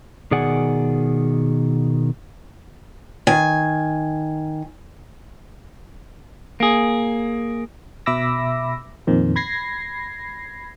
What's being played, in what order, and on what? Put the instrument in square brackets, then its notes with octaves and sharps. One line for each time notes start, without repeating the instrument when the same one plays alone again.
[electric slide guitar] B2 D#3 G#4 D5 F#5 G#5
[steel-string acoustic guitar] D#3 G#5
[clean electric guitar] A#3 G#4
[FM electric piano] B2 E5 B5 D6 E6 A#6
F2 A#2 D#3 C4
B5 G#6 A#6 C7